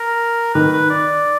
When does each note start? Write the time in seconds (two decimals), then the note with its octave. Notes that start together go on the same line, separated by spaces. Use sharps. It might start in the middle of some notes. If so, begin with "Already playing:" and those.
Already playing: A#4
0.54 D#3 B4
0.73 B4
0.90 D5